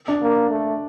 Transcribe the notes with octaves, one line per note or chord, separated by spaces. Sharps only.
D4
A#3
A3